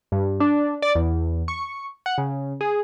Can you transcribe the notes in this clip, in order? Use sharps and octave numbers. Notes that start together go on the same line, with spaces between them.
G2
D4
D5
E2
C#6
F#5
C#3
G#4